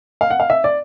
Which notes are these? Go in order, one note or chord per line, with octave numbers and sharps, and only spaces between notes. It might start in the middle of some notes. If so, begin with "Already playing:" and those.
F5
F#5
F5
E5
D5